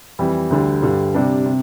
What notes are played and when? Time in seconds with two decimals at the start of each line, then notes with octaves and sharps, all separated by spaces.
0.19 F2 E3 G3
0.50 D2 D3 G3
0.82 G2 D3 G3
1.14 C3 G3 D4
1.46 C3